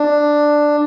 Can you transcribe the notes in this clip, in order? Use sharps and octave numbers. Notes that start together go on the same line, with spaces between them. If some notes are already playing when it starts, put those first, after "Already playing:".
Already playing: D4